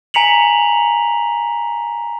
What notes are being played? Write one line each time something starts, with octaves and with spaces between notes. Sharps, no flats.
G#5 A#5 B6 C#7 F7 F#7